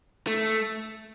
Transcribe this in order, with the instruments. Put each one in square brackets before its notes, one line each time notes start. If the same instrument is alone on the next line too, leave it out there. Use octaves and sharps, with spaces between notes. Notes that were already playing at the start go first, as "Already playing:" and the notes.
[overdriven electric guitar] A3